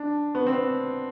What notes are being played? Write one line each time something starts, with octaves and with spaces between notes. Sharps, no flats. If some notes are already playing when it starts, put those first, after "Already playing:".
Already playing: D4
B3
C4